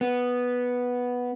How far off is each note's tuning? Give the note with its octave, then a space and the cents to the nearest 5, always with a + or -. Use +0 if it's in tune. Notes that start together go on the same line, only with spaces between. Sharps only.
B3 -5